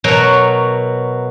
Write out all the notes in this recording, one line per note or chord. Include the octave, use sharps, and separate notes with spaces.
B2 F#3 F#4 A#4 C#5